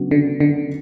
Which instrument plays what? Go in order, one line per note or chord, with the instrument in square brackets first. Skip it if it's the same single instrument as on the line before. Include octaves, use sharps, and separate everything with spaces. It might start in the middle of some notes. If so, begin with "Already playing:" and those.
Already playing: [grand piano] C#3 F#3 B3 D4 F#4
[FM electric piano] D3
D3